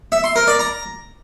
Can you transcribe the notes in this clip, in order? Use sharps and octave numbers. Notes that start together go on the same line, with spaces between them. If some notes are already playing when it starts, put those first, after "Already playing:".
E5
C6
A#4
D5
A#5